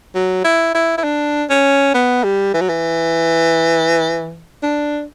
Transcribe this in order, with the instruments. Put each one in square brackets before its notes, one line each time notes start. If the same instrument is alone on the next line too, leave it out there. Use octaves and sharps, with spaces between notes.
[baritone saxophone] F#3
E4
E4
E4
D4
C#4
B3
G3
E3
F#3
E3
D4